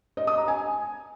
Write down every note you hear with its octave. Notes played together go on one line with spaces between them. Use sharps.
D#5
D#6
A#5
G#5